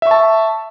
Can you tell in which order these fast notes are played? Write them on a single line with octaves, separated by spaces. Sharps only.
E5 C#6 A5